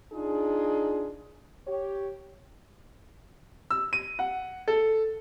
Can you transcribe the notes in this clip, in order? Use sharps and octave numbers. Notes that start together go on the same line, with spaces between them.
D4 D#4 F4 G#4
G4 C#5
E6
D#7
F#5
A4